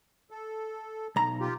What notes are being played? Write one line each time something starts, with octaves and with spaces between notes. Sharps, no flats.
A4
B1 A#5
F4 G4